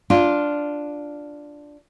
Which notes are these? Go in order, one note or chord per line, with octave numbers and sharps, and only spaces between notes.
D4 F4